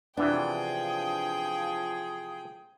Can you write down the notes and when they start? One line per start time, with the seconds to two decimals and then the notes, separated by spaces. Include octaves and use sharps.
0.17 C3 E3 F3 B3 D4 G#4 G5